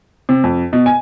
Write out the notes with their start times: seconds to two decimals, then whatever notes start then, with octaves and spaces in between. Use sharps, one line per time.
0.29 C3
0.44 F2
0.73 B2
0.86 G#5